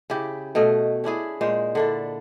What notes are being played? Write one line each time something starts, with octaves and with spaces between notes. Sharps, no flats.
C#3 E4 G4
B2 A3 D#5
C#4 D4 E4 G#4
A#2 G#3 C5
D3 D4 E4